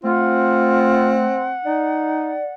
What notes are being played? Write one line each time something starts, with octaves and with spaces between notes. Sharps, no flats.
A3 C4 F4 F#5
D#4 D5